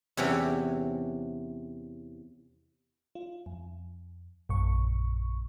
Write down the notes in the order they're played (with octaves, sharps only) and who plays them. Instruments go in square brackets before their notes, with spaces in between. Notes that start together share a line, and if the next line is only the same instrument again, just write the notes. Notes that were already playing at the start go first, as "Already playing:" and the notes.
[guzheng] E2 C3 E3 C#4 G4
[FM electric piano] F4
F2
A#1 F#2 A#2 C#6